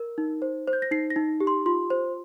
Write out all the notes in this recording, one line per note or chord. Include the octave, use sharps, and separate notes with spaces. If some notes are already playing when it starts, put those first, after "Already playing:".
Already playing: A#4
D#4
C5
C5
G6
A#6
D#4 C7
A#6
D#4
G4
C6
F4 C6
C5